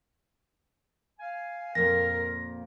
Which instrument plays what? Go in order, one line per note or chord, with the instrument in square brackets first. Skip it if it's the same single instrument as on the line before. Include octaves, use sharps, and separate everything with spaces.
[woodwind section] F5 G#5
[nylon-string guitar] F2 A#2 [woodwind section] A#4 [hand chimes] A#6